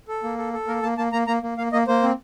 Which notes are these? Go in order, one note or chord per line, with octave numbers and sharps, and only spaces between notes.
A4
A#3
A4
A4
A#3 A#4
A#3 A5
A#3 A5
A#3 A#5
A#3 A#5
A#3
A#3 F5
A#3 D#5
A#3 C5
C4